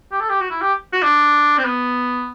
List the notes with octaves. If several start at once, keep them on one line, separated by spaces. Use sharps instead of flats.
G4
A4
G4
F#4
E4
G4
F#4
D4
C4
B3